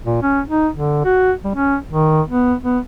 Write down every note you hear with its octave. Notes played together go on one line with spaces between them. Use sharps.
A#2
C#4
D#4
D3
F#4
G3
C#4
D#3
B3
B3